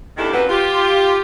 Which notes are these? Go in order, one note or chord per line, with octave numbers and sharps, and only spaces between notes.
E2 D#3 A3 D4 E4 G4
F#3 G3 A#3 C4 C#4 B4
F4 G4